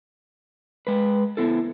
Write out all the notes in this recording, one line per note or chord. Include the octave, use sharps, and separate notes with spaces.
G#3 B4
B3 E4 A4